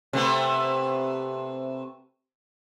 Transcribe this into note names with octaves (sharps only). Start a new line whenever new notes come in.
C3 A3 B3